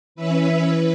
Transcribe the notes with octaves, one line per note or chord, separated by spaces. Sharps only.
E3 C#4 B4 E5
E3 B4